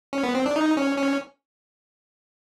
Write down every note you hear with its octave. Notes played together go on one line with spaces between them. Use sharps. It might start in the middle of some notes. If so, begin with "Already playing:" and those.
C#4
B3
C4
D4
D#4
C#4
C#4